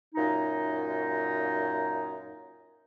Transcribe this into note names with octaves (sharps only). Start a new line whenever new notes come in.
F#2 A#2 D#4